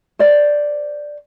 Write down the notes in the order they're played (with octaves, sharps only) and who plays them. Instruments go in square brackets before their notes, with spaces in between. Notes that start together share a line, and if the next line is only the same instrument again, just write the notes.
[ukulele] C5 D5